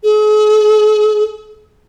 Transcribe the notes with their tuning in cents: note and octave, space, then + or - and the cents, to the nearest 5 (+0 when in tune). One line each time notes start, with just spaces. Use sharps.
G#4 +45